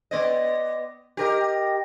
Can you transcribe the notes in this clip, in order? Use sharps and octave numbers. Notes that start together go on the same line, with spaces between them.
B3 D5 D#5
G4 A#4 D#5